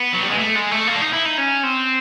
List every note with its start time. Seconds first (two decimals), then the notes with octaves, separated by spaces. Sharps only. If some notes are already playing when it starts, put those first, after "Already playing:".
Already playing: B3
0.13 F#3
0.21 G3
0.30 G#3
0.38 A3
0.55 G#3
0.71 A3
0.88 A#3
0.96 D4
1.01 D#4
1.13 E4
1.26 D#4
1.38 C#4
1.63 C4